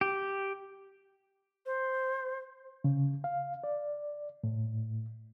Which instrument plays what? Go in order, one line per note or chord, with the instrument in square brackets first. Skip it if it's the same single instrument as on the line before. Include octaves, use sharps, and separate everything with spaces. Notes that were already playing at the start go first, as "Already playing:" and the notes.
[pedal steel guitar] G4
[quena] C5
[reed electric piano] C#3
F5
D5
A2